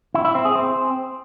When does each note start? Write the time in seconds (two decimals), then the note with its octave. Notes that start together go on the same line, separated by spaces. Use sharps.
0.14 E4
0.25 E4
0.35 C4
0.45 G#4
0.55 C4